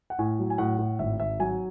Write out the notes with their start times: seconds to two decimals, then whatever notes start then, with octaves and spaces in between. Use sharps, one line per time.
0.10 F#5
0.19 A2 G#5
0.39 F#3
0.50 G#5
0.58 A2 F#5
0.79 A2
0.99 G#1 E5
1.19 G#1 E5
1.40 F#3 G#5